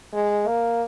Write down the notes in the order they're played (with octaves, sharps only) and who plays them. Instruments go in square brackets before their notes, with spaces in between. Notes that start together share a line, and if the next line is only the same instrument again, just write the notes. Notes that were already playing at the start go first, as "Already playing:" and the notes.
[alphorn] G#3
A#3